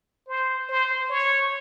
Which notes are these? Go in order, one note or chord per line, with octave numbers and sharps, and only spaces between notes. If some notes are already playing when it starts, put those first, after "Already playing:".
C5
C5
C#5